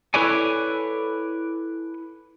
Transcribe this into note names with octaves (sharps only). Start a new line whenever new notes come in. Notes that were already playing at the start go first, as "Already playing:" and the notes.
E4 A4 B4 C#5 D5 G#5